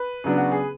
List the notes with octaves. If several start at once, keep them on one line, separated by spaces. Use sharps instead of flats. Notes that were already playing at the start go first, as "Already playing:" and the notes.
Already playing: B4
C#3 F#3 B3 D4
F#4
G#4